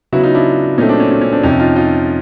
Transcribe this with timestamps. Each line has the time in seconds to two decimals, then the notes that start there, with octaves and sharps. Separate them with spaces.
0.12 C#3 F#3 B3 E4 F#4
0.23 D#4 F4
0.34 D4 E4
0.78 A#2 F#3 A3 C4 C#4 D#4
0.89 C4 D4
1.00 C#4
1.11 C#4
1.21 C#4
1.32 C4 D4
1.43 F2 C3 F3 C#4 D#4
1.59 D#4 F4
1.76 D#4 F4